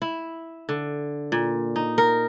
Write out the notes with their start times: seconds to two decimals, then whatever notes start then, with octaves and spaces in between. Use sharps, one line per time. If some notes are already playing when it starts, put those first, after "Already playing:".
0.02 E4
0.69 D3
1.32 A#2
1.76 D#4
1.98 A#4